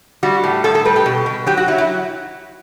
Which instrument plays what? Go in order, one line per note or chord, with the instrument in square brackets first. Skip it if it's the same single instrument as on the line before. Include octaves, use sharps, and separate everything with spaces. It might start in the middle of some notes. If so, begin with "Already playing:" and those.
[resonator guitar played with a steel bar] G3 F#4
A2
A2 A4
A4
G3 B4
G4
B2
B2
F#3 G4
F#4
F#3 E4
E4